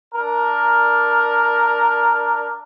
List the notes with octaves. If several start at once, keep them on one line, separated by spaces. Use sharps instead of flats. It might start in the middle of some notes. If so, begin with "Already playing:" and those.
D4 A#4